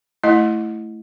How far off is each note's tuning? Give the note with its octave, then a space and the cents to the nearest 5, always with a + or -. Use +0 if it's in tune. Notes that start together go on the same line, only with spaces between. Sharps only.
A3 +0 E4 +0 D#5 +0